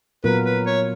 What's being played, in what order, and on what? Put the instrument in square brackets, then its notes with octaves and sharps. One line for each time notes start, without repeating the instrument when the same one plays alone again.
[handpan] A#2 F#3 B3 F4 A#4 [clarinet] B4
[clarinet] B4
C#5